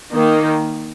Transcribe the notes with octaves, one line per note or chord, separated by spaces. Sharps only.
D#3 A#3 D#4